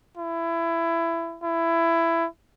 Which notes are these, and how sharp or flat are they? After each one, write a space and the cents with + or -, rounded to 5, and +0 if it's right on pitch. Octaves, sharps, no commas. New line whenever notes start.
E4 +20
E4 +15